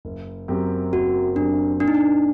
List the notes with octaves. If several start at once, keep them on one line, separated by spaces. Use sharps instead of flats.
F#1
F#2 F#3 C4 G4
F#1 F#4
F#2 F#3 C4 D4 G4
A#2 D4
D#4
D4